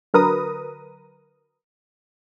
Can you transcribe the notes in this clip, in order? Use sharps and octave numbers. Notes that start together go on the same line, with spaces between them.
D3 F#3 A#4 B4 A#5 D#6